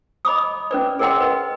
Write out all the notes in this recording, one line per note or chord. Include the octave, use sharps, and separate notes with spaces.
D#5 B5 D6 D#6
C#4 B4 D5
G#4 A#4 D#5 F#5 G5 C6
B4 D#5